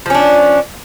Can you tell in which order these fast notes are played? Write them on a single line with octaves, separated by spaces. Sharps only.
F3 C#4 D4